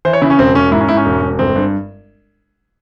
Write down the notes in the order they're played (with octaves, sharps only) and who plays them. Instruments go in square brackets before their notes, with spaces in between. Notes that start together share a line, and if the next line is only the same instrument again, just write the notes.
[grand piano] E3 C5
C#5
C#3 E4
C#4
E1 C4
E1 C#4
G#2 E4
C#4
G#2 E4
C#4
E1
E1
G1 C4
G2